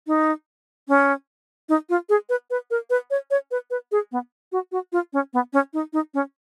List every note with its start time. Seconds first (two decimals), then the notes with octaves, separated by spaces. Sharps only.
0.07 D#4
0.88 C#4
1.69 D#4
1.89 F4
2.09 G#4
2.29 B4
2.50 B4
2.71 A#4
2.90 B4
3.10 C#5
3.31 C#5
3.51 B4
3.70 B4
3.92 G#4
4.12 B3
4.52 F#4
4.72 F#4
4.92 F4
5.13 C#4
5.33 B3
5.53 C#4
5.73 D#4
5.93 D#4
6.14 C#4